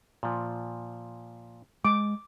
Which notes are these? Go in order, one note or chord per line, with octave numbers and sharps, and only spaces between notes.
A#2 F3
G#3 D6